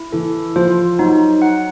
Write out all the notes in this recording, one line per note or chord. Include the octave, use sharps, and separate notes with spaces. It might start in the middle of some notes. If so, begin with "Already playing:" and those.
Already playing: E4
E3 A4
F3 C5
F#3 D#4
F#5